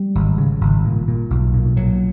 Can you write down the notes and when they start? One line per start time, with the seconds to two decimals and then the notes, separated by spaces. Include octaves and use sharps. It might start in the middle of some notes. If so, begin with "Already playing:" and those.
Already playing: G3
0.15 G#1
0.38 C#3
0.61 G#1
0.84 A#2
1.08 A#2
1.30 B1
1.54 A#2
1.77 A#2 F#3